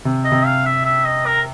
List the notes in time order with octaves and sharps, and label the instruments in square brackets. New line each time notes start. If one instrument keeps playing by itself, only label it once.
[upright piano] C3
[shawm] D#5
[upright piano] C3
[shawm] F5
E5
E5
D#5
A#4